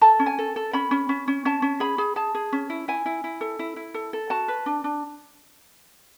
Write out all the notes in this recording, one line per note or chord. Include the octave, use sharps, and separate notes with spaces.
A4 A5
C#4
G#5
A4
A4
C#4 B5
C#4
C#4
C#4
C#4 A5
C#4
G#4 B5
G#4
G#4 A5
G#4
C#4
E4
E4 G#5
E4
E4
A4
E4
E4
A4
A4
F#4 A5
B4
D4
D4